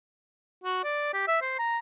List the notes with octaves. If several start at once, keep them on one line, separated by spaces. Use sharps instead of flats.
F#4
D5
G4
E5
C5
A#5